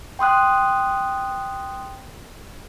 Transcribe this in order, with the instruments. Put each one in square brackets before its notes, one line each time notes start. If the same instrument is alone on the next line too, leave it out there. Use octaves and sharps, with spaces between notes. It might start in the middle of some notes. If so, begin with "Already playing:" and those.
[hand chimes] G5 C6 D#6 F#6